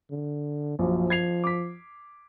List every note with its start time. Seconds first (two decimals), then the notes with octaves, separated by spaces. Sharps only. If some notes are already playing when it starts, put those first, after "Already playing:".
0.11 D3
0.79 A#1 F#2 F3
1.10 G#6 C7 F7
1.44 D6 B6